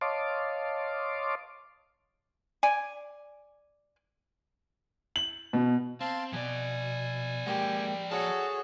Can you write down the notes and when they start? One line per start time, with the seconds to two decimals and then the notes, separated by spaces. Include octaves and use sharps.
0.01 C#5 D#5 F5 A5 C6 D6
2.63 D5 G#5
5.16 F#7
5.53 B2
6.01 C4 F5 A5 C6
6.33 B2 F3 D5 G#5
7.46 G#3 A#3 G4
8.11 F#4 G#4 A4 C#5 A5